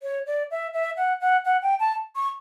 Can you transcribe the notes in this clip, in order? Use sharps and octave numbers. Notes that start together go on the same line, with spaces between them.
C#5
D5
E5
E5
F#5
F#5
F#5
G5
A5
C#6